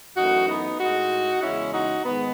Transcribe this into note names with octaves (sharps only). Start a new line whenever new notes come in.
F#2 E3 A3 D#4 F#4
B3 D#4
A2 G#3 D#4 F#4
E2 C#3 G#3 C#4 E4
D#4 F#4
G#2 D#3 G#3 B3